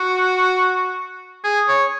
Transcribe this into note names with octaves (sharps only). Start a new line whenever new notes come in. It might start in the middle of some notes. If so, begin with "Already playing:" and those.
Already playing: F#4
G#4
C#5